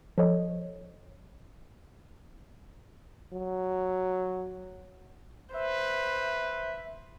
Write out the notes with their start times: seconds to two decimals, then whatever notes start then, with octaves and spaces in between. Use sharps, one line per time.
0.18 F3 A4 C#5 D#5
3.34 F#3
5.54 B4 C5 E5